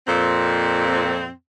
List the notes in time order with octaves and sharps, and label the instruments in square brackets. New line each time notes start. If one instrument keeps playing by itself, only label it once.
[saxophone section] F2 A#2 C4